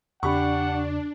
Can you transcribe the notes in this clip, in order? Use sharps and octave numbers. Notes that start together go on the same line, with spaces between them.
E2 C#3 D4 G4 F#5 B5 C#6